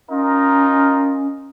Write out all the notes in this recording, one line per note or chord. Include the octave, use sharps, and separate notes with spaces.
C#4 D#4 F4 A#4